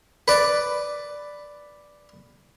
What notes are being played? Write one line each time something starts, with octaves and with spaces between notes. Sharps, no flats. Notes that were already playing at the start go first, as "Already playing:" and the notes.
B4 D5